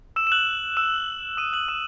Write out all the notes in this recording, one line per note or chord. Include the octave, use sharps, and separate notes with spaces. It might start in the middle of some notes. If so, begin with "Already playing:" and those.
E6 E7
E7
F#6 F#7
E6 E7
D#6 D#7
F#6 F#7
E6 E7